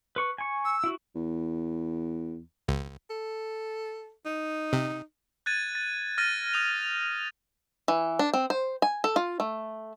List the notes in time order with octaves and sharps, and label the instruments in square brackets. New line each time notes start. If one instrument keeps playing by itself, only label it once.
[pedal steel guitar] B4 C#6
G#5 C#6
[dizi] E6
[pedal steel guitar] E4 F#4
[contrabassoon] E2
[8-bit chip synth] C#2
[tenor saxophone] A4
D#4
[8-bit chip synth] C3
[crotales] F#6 G#6 A6 D#7
A6
F6 A6 A#6 D#7
D#6 G6 F7
[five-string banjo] E3
D4
C4
C5
G#5
A4
F4
A3